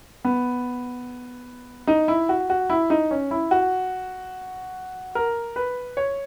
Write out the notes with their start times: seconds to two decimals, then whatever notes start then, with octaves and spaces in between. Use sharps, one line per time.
0.25 B3
1.87 D#4
2.08 E4
2.29 F#4
2.50 F#4
2.70 E4
2.90 D#4
3.11 C#4
3.31 E4
3.51 F#4
5.15 A#4
5.56 B4
5.97 C#5